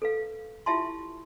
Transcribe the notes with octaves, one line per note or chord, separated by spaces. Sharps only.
A4 B4 F5
E4 F4 G4 E5 A5 C6